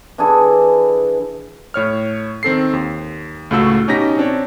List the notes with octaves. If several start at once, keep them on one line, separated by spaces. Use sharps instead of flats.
E3 D4 G#4 A4
A2 C#5 F6
D#3 C4 A4 C7
D#2
C#2 A2 A3 F#4 A4 E6
B2 C#4 D#4 G4 A#6 B6
C4 D4 C#5